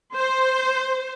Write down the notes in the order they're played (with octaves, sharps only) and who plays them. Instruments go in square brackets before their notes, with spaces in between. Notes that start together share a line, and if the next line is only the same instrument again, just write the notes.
[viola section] C5